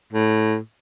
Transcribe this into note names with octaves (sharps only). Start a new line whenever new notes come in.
A2